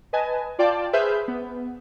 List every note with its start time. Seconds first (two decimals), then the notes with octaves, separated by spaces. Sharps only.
0.13 B4 D#5 G#5 A5
0.59 F4 D5 F5 G5 A5 D6
0.93 G#4 B4 C5 E5 F6 G6
1.28 B3